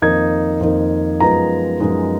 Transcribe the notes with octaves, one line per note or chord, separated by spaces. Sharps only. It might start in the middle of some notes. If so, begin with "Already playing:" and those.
F2 D#3 A#3 D#4 G#6
F2 D#3 A#3 D#4
F#2 F3 G#3 B3 D#4 A#5
F#2 F3 G#3 B3 D#4